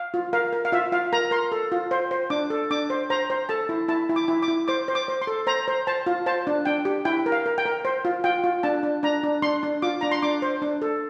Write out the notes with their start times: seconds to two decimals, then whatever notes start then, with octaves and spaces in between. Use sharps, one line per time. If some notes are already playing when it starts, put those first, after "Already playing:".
Already playing: F5
0.14 F4
0.33 A#4 F5
0.53 A#4
0.65 F5
0.72 F4 E5
0.92 F4 F5
1.13 A#4 A#5
1.31 A#4 C6
1.52 A4
1.72 F4
1.91 C5
2.11 C5
2.30 D4 D6
2.50 A4
2.71 D4 D6
2.90 C5
3.10 C5 A#5
3.30 C5
3.49 A4 A5
3.69 E4
3.88 E4 A5
4.09 E4
4.16 D6
4.28 E4
4.42 D6
4.48 E4
4.68 C5 D6
4.88 C5
4.95 D6
5.08 C5
5.22 C6
5.27 A4
5.47 C5 A#5
5.68 C5
5.87 C5 A5
6.06 F4
6.26 C5 A5
6.47 D4
6.65 D4 G5
6.85 G4
7.05 E4 G5
7.26 A#4
7.32 F5
7.46 A#4
7.58 G5
7.65 A#4
7.85 C5
8.05 F4
8.24 F4 G5
8.44 F4
8.63 D4 A5
8.83 D4
9.03 D4 A#5
9.23 D4
9.42 D4 C6
9.63 D4
9.82 F4 D6
10.01 D4 A#5
10.12 C6
10.22 D4 D6
10.42 C5
10.62 D4
10.82 A4